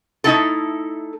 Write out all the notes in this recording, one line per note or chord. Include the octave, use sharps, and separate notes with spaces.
A3 D#4 E4 A4